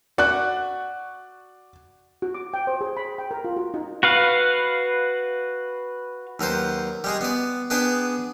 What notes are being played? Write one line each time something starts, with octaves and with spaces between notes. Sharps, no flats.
F#4 D5 F#6
F#4
D6
G5
C5
G#4
B5
G5
A#4
F4
F#4
D#4
F#4 B4 F5
D#2 F#3 B4 C5
G3 G#3 G#4
B3 D5
B3 D4 G#4 B4 D5 G5